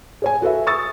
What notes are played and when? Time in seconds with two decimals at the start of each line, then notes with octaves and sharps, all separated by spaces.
0.22 G#4 C#5 G#5
0.42 F#4 A4 B4 E5
0.67 C#6 D#6 E6 A6